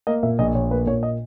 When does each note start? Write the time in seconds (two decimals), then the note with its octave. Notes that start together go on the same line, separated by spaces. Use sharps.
0.07 A#3 D#5
0.23 A#2 E5
0.39 A#1 D#5
0.55 A#1 C#5
0.71 A#3 B4
0.86 A#2 C#5
1.03 D#5